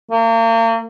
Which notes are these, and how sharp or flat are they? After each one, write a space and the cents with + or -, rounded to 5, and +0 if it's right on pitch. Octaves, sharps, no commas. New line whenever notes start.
A#3 -40